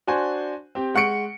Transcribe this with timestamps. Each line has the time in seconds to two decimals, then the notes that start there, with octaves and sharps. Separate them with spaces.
0.07 D4 F#4 C5 G#5
0.75 C4 G4
0.94 G#3 F#5 C#6 C#7 D7